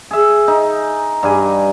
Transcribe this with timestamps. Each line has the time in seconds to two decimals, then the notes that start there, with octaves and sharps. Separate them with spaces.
0.11 G#4 E5
0.48 D#4
1.23 G2 G3 G#5